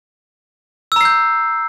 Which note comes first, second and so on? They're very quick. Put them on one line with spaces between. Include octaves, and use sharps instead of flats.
E6 A#5 C7 G6